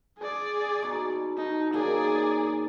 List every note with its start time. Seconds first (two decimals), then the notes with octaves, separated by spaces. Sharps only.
0.18 G#4 D5
0.82 B2 D#4 C#6
1.37 D#4 A4
1.74 D#3 F#3 A#3 G#4 D5